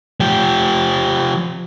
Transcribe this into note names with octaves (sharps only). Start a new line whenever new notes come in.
F3 G4